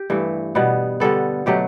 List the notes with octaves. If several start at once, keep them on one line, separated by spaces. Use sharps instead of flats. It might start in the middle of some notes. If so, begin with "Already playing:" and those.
Already playing: G4
G2 E3 A3
B2 G3 B3
D3 G3 B3 A4
B2 F#3 A3 G4